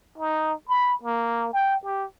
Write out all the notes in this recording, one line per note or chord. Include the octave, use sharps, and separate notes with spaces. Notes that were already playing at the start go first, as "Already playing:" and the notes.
D#4
B5
A#3
G5
G4